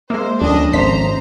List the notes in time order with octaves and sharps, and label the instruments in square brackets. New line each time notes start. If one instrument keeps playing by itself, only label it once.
[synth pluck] G#3 A#3 [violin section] C5 [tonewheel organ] E5
[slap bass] D2 [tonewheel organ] F3 C#4 [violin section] D4 D#5
[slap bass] G#1 [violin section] C5 A#5 [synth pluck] B6